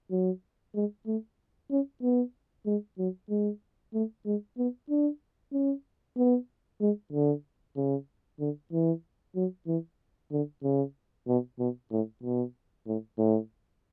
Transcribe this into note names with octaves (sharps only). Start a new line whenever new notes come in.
F#3
G#3
A3
C#4
B3
G#3
F#3
G#3
A3
G#3
B3
D4
C#4
B3
G#3
D3
C#3
D3
E3
F#3
E3
D3
C#3
B2
B2
A2
B2
A2
A2